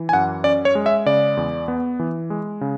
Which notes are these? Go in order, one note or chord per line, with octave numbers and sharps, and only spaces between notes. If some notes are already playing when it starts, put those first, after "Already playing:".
Already playing: E3
G#5
F#2 F#5
C#4 D5
C#5
G#3
E5
C#3 D5
E2
B3
E3
G#3
C#3